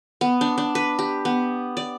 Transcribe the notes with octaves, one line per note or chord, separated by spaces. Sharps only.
B3
D4
D4
B4
G4
B3
D5